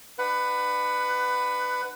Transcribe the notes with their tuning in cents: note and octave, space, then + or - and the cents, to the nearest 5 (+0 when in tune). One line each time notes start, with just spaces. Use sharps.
D4 +40 B4 +15 F#5 +5